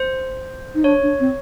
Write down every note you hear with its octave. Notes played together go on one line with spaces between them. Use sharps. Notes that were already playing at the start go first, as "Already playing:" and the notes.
Already playing: C5
D#4
D4 C#5
D4
C4